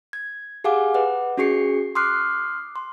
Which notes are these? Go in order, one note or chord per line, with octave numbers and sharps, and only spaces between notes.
G#6
G4 G#4 F5 F#5 G#5 D6
B4 D#5 F#5
C#4 F#4 G#4 C#6 C7 C#7
C6 D6 D#6 F6 F#6 C7
C6